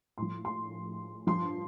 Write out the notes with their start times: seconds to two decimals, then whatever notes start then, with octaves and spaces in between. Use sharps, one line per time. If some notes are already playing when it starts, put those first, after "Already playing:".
0.17 A2 F3 C6
0.45 C6
1.27 G2 F3 C6